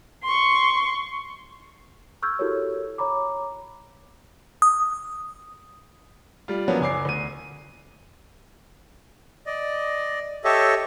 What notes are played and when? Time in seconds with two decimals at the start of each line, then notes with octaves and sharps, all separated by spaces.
0.25 C6 C#6
2.22 C#6 E6 F6 G6 G#6
2.39 E4 F#4 G4 A4 A#4 C#5
2.98 C#5 A#5 B5 D6
4.62 D#6
6.48 G3 F4
6.68 F3 F#3 A#3 B3 C#4 D4
6.80 F#1 G#5 D6 C7
7.05 D2 D#7
9.46 D5 D#5
10.44 G4 A4 C#5 D#5 E5